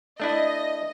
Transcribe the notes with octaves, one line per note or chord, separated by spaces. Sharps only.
A3 D4 E4 D#5